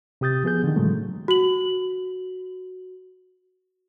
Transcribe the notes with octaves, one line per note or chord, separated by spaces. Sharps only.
C3 G4 D#6 G6 A6
F3 B3 G#4 G6
D3 D#3
A2 C#3 E3 F#3 G#3 A3
F#4 F#7